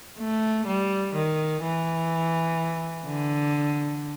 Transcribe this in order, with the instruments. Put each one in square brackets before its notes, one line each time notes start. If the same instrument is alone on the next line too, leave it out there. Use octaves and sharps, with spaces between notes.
[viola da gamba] A3
G3
D#3
E3
D3